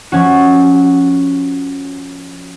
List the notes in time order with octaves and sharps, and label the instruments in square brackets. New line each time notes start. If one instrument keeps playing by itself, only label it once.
[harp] F3 C#4 F#4